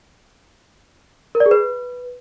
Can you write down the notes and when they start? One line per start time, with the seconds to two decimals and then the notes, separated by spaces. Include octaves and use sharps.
1.35 A#4
1.40 D5
1.46 G#4
1.51 B4